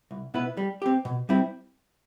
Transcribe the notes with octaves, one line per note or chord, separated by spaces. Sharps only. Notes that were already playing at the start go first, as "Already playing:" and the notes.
C2
B2 B3 E4 B4
G3
C4 G4
B2
G3 C4 E4